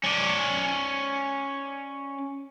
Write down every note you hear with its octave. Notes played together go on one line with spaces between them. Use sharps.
C#4 D5